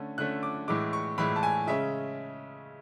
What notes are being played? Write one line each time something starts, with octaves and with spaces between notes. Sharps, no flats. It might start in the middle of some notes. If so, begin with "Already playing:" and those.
Already playing: D3 A3 C#4
D3 A3 C#4 F#6
D6
A2 E3 G#3 D6
C#6
A2 E3 G#3 B5
A5
G#5
C#3 G#3 C#4 E5